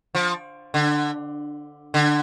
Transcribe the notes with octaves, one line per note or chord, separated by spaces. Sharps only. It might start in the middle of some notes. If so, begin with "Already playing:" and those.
F3
D3
D3